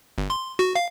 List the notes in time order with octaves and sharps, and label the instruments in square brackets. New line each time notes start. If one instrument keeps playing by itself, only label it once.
[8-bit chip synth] G1
C6
F#4
F5